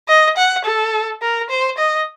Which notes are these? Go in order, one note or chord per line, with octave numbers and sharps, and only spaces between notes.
D#5
F#5
A4
A#4
C5
D#5